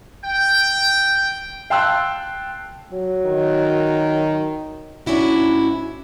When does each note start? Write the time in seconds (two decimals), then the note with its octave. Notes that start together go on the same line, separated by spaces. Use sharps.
0.24 G5
1.70 F5 G5 A5 C6 E6 F#6
2.92 F#3
3.25 D#3
5.06 G#2 C#4 D4 E4 F#4